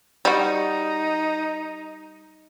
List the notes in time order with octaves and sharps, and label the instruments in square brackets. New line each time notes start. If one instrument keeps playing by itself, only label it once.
[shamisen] G3 F#4 [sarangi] D#4